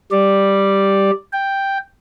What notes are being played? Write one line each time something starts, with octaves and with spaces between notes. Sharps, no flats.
G3 D5
G5